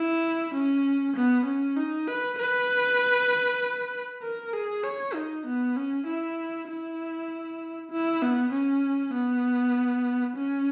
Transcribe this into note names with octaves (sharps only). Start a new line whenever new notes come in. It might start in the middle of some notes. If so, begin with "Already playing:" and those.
Already playing: E4
C#4
B3
C#4
D#4
B4
B4
A#4
G#4
C#5
D#4
B3
C#4
E4
E4
E4
B3
C#4
B3
C#4